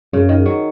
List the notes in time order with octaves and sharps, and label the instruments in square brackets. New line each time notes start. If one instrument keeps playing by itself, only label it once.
[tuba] F#2 [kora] C#3
[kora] D#3
F#3